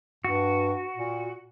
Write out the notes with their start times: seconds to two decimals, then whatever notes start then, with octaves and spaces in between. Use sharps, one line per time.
0.25 G2 F#4
0.96 A#2